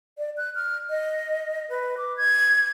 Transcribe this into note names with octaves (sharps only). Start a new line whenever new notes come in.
D5
F#6
F6
D#5
B4
D6
G#6